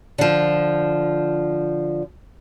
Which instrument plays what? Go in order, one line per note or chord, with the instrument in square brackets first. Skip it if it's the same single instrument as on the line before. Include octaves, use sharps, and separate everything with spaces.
[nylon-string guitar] D3 F3